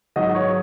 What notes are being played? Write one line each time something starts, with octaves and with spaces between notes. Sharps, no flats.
G#2 D#3 F#3 D#5
C#5